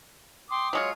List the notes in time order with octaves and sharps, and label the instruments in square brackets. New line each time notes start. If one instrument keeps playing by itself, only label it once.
[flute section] G5 D6 D#6 [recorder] C6
[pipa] F#3 G#3 F4 [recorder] C#5